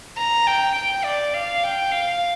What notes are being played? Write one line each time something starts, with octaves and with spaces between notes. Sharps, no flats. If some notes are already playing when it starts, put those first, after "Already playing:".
A#5
G5
G5
D5
F5
G5
F5